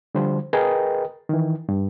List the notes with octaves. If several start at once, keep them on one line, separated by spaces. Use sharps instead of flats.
D3 F3 G3 C5
G#4 A#4 B4 D#5 G5
D#3 E3
G2